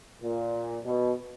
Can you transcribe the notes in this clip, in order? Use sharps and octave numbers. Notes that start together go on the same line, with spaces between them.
A#2
B2